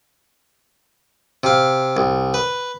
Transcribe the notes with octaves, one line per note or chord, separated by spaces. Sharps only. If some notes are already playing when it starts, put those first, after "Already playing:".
C3 F5
C2
B4